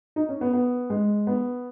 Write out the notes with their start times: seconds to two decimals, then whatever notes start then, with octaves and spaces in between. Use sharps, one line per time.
0.16 D#4
0.29 C#4
0.41 B3
0.53 B3
0.90 G#3
1.27 B3